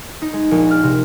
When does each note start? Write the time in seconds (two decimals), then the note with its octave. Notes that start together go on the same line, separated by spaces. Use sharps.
0.22 D#4
0.33 G#3
0.51 A#1
0.71 F6
0.83 C3